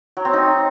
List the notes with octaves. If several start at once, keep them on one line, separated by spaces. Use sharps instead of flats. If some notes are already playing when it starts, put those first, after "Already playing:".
F#3
C4
D#4